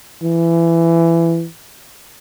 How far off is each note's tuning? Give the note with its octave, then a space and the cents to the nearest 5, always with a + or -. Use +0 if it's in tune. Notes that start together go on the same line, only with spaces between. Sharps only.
E3 +20